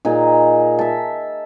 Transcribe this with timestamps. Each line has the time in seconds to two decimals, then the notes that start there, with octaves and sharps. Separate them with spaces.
0.05 A#2 D#4 G#4
0.79 E5 A5